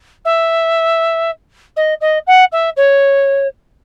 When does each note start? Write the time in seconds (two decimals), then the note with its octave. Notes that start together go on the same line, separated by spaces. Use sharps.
0.25 E5
1.76 D#5
2.01 D#5
2.27 F#5
2.52 E5
2.77 C#5